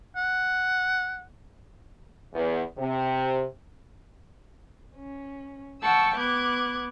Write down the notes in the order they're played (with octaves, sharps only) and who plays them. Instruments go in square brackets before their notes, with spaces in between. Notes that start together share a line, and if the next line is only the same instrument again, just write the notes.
[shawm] F#5
[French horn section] E2
C3
[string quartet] C#4
F#5 G5 A5 C#6 E6
B3 D6 F#6 G#6